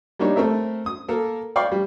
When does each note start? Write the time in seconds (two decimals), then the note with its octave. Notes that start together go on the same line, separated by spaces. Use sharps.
0.19 G3 A#3 D4 D#4 C#5
0.36 A3 C4 A#4 E5
0.86 D#6
1.08 A#3 A4 A#4
1.56 D5 F5 G5 B5 C#6
1.72 G3